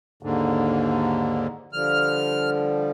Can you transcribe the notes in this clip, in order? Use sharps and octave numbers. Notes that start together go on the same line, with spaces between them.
D#2 G#2 D3
D3 F3 G3 F6